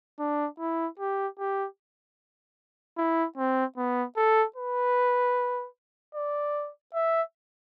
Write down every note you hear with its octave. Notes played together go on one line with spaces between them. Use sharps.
D4
E4
G4
G4
E4
C4
B3
A4
B4
D5
E5